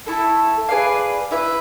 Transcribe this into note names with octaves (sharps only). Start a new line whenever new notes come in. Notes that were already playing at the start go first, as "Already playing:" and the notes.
A3 E4 A4
G#4 B4 D5 F5
E4 B4 E5